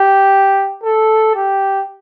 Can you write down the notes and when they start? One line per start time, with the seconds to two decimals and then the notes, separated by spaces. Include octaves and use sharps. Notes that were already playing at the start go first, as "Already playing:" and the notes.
Already playing: G4
0.83 A4
1.35 G4